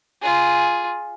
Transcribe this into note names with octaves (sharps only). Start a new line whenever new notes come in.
F4 G#4